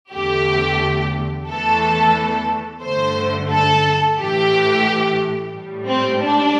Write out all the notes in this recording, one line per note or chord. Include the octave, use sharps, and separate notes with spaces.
E2 D3 A3 G4
E2 E3 A3 A4
G2 D3 A3 C5
A4
A2 E3 A3 G4
A2 G3
C4
D4